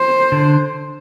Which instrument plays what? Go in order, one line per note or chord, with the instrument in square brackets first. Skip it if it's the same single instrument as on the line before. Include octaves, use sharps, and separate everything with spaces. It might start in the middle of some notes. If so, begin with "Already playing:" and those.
Already playing: [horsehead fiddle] C5
[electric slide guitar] D3